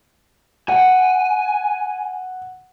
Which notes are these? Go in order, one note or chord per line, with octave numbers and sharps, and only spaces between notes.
F#5 G#5